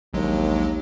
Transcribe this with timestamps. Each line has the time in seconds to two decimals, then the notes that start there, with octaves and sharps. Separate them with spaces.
0.14 A#1 D#2 F#3 G#3